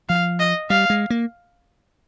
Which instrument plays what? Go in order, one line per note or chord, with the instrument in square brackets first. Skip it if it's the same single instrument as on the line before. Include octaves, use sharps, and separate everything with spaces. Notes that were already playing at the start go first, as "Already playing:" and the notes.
[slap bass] F3 [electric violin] F5
[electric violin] D#5
[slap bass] G3 [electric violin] F5
[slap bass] G#3
A#3